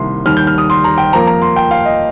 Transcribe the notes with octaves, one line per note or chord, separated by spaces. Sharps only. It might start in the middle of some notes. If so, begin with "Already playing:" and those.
Already playing: C2 C3 D#3 A#3 C6
D#2 D#3 G3 F6
G6
F6
D#6
C6
A#5
G5
F2 F3 A#3 A#5
A#5
C6
G5
F5
D#5